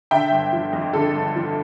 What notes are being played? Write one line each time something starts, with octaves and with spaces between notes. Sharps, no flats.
D3 E5 G5
G1
F3
F2
D3 A4
G1
F3